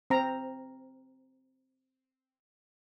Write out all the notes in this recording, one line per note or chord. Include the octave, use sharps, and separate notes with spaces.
C4 A#5